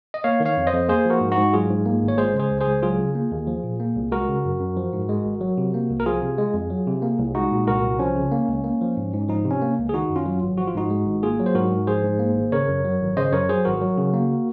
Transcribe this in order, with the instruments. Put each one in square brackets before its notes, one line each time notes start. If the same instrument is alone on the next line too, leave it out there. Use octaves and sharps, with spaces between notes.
[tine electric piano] D#5
A#3 C#5 F5
D#3
C#5 F5
F2
C5 D#5
F2
A#3 G#4 C5
F3 F#4 A#4
G#2
D#4 F#4
G#2
F#3 F4 G#4
G#2
A#3
G#1
C#5
G#3 G#4 C5
C#3
G#4 C5
C#2
G#4 C5
C#2
F#3 F4 G#4
C#3
A#3
D#2
F3
A#2
A#3
C2
G#3 F#4 A#4
C#3
F#2
F#2
F3
G#2
G#3
G#1
F#3
C3
A#3
C2
A#4
F3 F4 G#4
C3
G#3
F2
F#3
C3
A#3
C2
G#3 D#4 F#4
A#2
C2 F#4 A#4
C2
F3 C#4
C#3
A#3
C#2
A#3
F3
G#2
G#2
F3 D#4
C3
C#4
A#3
C#2
G#4
D#3 D#4 F#4
F#2
C#4 F4
F#3
G#1
F3 F#4
F4
G#2 D#4 F#4
G#3
G#1
A#3 F4 G#4
F#3
C5
G#2 F#4 A#4
G#2
F3 G#4 C5
G#2
A#3
G#1
C#3 A#4 C#5
F#2
F#3
G#1
C#3 C5 D#5
F#2 A#4 C#5
F#3 G#4 C5
G#1 F#4 A#4
F#3
C#3
A#3